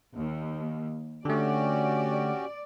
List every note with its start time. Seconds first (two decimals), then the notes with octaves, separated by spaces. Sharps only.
0.14 D#2
1.25 D3 A3 C#4 F#4 G4 D5